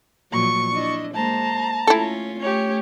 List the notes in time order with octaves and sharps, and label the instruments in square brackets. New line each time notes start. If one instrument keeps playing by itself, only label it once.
[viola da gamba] A#2 F3 F#3 [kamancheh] C#6
[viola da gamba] D4 E4 D#5
[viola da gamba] G#3 A#3 C5 [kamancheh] A5 A#5
[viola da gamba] A3 C#4 F4 [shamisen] E4 A4
[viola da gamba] A3 C#4 [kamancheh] G4 C#5